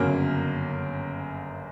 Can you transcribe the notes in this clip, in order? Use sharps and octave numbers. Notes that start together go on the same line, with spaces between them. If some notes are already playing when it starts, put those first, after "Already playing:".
Already playing: G1 F#2 C#3 F#3 A#3